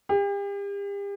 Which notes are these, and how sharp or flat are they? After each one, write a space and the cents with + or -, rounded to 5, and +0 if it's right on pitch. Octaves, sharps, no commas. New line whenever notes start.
G4 +40